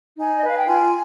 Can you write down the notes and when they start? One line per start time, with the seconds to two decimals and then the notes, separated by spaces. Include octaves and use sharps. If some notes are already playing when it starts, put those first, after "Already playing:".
0.18 D#4 G#5
0.38 D#5
0.43 B4 F5
0.57 G5
0.67 F4 G#5